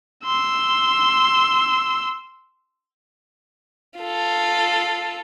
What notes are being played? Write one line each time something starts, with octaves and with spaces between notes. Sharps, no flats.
C6 E6
F4 A4